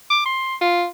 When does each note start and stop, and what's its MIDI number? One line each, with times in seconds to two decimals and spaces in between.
0.10 0.22 86
0.25 0.56 84
0.61 0.86 65